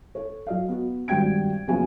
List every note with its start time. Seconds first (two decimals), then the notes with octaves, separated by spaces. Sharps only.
0.15 A4 C#5
0.47 F#3 D#5 F5
0.68 B3 F#4
1.08 G#1 G2 F#4 G5 G#6 D7
1.68 F#1 C#3 F3 B3 F#4 G#5